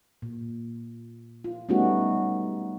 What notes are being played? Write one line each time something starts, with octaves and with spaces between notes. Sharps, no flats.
A#2
F4
G3 A3 B3 C#4 D#4 F#4